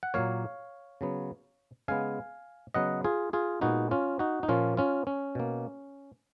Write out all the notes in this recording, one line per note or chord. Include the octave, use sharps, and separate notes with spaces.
F#5
A#2 F#3 A#3 C#5 F5
C#3 F#3 B3
C#3 G#3 B3 F5 G#5
C#3 F#3 B3 D#5 F#5
F4 G#4
F4 G#4
A#2 G#3 B3 D#4 F#4
C#4 F4
D#4 F#4
D#4
A#2 F3 A#3 C#4 F4
C#4 F4
C#4
B2 A#3